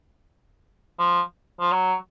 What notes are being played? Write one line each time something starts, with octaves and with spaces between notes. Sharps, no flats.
F3
F3
F#3